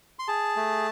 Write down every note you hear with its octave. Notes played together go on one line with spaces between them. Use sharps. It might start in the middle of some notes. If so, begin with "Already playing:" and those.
C6
G#4 A5
A3